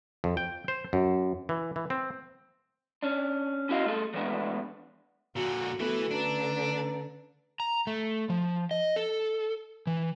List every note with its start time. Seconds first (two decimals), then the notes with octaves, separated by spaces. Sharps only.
0.24 F2
0.37 G5
0.68 C5
0.93 F#2
1.49 E3
1.76 E3
1.90 C4
3.03 C#4 D4
3.69 C#4 E4 F#4 D#5 F5
3.86 A3 G#4 A4
4.14 E3 G#3 A3 B3 D4
5.36 A#2 D3 F#4
5.80 E3 A3 B3 F#4 B4
6.12 D3 C#4 D4 B4 A#5
7.60 A#5
7.87 A3
8.30 F3
8.71 D#5
8.96 A4
9.87 E3